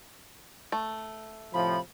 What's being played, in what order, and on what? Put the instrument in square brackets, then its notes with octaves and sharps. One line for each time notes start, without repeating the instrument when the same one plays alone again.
[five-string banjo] A3
[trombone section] A2 C3 F3 [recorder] B5